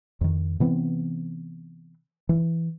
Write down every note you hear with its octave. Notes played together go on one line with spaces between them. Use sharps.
F2 D#3
C3 E3 B3 C4
E3